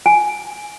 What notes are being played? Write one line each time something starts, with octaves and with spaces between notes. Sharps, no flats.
G#5